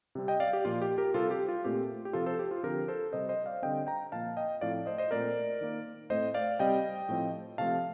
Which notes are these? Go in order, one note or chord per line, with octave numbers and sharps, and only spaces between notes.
C3 G3 C4
D#5 G5
D5 F5
G4
A#2 F3 A#3 F4
G4
G4 A#4
C3 G3 C4 F4 A4
G4
F4
A#2 A3 C4 G4
G4
C3 F3 C4 F4 A4
A4 C5
G4
F4
D3 F3 C4 G4 A#4
A4 C5
C3 G3 C4 C5 D#5
C5 D#5
D5 F5
D3 G3 C4 D#5 G5
G5 A#5
A#2 F3 A#3 F5 A5
D#5 G5
A2 F3 C4 D5 F5
C5 D#5
C5 D#5
A#2 A3 C4 A#4 D5
D#3 A#3
A2 A3 C4 C5 D#5
D5 F5
C3 G3 C4 D#5 G5
A2 F3 C4
C3 F3 A3 C4 F5 A5